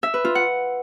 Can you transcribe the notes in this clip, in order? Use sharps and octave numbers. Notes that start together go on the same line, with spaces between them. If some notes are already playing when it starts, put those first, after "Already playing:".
E5
B4
F4
F#5